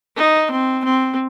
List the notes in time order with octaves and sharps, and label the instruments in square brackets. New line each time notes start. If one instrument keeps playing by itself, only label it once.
[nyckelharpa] D#4
C4
C4